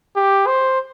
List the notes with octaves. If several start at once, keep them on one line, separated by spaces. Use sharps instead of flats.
G4
C5